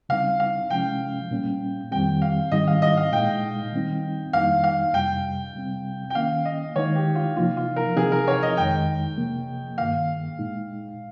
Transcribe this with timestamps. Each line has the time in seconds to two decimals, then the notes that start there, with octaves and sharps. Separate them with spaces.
0.09 C#3 G3 C4 D#4 F5
0.40 F5
0.70 C3 F3 G#3 C#4 G5
1.31 A#2 G3 A#3 C#4
1.91 F2 D#3 G3 C4 G5
2.22 F5
2.52 G#2 D#3 G3 C4 D#4 D#5
2.67 F5
2.82 D#5
2.97 F5
3.12 A#2 G#3 D#4 G5
3.73 D#3 G3 C4 D#4
4.33 F2 D#3 G3 A#3 D#4 F5
4.64 F5
4.94 F2 C3 G3 G5
5.55 C3 G3 C4
6.10 G5
6.15 D#3 A#3 C#4 F5
6.45 D#5
6.76 D#3 G#3 D#4 C#5
6.95 G4
7.15 F4
7.37 C3 F3 A#3 D#4 F4
7.57 F4
7.76 A#4
7.97 C3 F3 C4 D#4 G#4
8.12 A#4
8.28 C#5
8.43 D#5
8.57 F2 D#3 G#3 D#4 G5
9.17 C3 F3 A#3
9.78 G2 D#3 A#3 F5
10.39 A#2 G#3 D#4